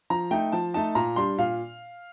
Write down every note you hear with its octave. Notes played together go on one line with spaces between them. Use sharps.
F3 A#5
A3 D#4 G5
F3 A5
A3 D#4 A5
A#2 A#5
G3 D4 C6
A#2 F5